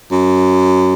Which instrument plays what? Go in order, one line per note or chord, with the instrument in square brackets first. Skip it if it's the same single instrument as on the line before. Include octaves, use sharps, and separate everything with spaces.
[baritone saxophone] F#2